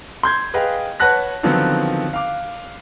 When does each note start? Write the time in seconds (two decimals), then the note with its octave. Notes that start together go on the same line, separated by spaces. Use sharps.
0.23 C6 G6 G#6
0.54 G#4 B4 D#5 F5 G5
1.00 B4 C#5 F#5 A5 F#6 A#6
1.43 D3 D#3 F3 F#3 B3 C4
2.13 F5 D6